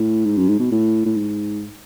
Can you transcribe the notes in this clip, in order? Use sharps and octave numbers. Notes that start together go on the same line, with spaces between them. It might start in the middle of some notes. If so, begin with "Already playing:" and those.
Already playing: A2
G#2
F#2
G#2
B2
A2
A2
G#2